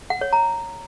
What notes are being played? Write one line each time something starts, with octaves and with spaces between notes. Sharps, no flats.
F#5
C#5
A#5